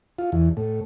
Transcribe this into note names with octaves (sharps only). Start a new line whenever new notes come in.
F4
E2
A2